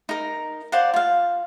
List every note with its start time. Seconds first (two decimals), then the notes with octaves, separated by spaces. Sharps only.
0.09 D#4 A#4
0.72 C5 D5 F5 F#5
0.94 F4 F5